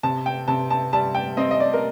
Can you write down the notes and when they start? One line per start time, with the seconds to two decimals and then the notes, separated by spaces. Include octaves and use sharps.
0.03 C3 A5
0.26 G5
0.48 C3 A5
0.70 A5
0.93 G3 A5
1.15 G5
1.37 C4 D#5
1.51 D#5
1.60 D5
1.74 A#4